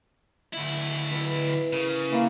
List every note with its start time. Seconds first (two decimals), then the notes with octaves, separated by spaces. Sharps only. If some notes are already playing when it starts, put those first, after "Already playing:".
0.53 D2 E4
1.11 E3 A#5
1.73 C#3 A#4
2.12 E3 A#3 A#5